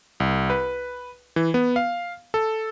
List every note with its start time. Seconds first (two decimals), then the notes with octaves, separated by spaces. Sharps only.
0.20 C2
0.50 B4
1.36 E3
1.54 B3
1.76 F5
2.34 A4